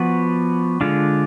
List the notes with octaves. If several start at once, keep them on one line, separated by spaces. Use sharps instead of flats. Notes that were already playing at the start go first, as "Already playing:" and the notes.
Already playing: F3 B3 F#4 B4 D5
D3 G#3 D4 F4